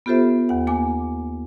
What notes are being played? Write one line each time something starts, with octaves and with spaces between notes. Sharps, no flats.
B3 F4 G4 A4 C5 E5
D#2 F#5
A#3 G#5 D6